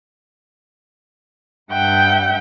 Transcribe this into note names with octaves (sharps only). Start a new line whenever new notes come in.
G2 E5 F#5 G5 G6